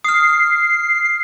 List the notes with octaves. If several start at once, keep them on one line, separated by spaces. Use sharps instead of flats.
D#6 F6 C7